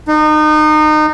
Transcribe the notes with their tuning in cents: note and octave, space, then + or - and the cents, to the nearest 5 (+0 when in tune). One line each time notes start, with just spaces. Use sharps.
D#4 -30